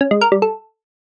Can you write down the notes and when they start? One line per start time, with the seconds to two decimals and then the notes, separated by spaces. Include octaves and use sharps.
0.01 C#4
0.11 G#3
0.21 A#4
0.32 G3
0.42 A4